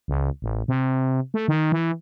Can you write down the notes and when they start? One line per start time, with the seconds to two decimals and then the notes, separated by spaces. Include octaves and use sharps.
0.08 C#2
0.42 A1
0.68 C3
1.34 A3
1.48 D#3
1.72 E3